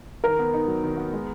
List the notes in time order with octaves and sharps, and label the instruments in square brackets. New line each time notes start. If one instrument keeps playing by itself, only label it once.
[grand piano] D#3 [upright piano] A#4
[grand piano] B3
D#4
F#3
D#3
B3
G#3